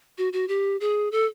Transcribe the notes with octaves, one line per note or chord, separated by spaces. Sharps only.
F#4
F#4
G4
G#4
A4